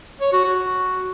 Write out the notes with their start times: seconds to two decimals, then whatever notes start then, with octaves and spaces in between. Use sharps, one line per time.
0.21 C#5
0.32 F#4
0.44 F#4